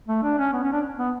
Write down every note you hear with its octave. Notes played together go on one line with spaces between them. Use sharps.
A3
D4
C#4
B3
C#4
D4
B3